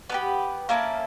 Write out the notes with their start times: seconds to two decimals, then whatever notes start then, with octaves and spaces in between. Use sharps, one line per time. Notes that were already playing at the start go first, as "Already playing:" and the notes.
0.10 B3 D4 G4 B4
0.69 A#3 C#4 E4 A4 A#4